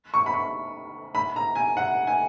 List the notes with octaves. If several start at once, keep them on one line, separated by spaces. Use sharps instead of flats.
C#6
B5
C#6
B5
A#5
G#5
F#5
G#5